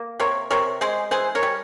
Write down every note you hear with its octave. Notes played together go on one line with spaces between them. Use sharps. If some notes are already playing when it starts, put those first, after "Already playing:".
Already playing: A#3
C3 A#4 C#5
C3 A#4 C#5
G#3 G#4 C5
E3 G#4 C5
A#4 C#5
G3